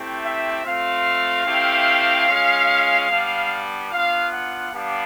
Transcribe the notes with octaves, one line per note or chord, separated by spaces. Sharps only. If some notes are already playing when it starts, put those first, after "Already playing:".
Already playing: A3 C4 E4 G4
E5
A3 C4 F4 F5
A3 C4 E4 G4
G#3 C#4 F4
G3 B3 D4
B3 D4 F4 F5
F#5
G3 B3 D4 G4 F5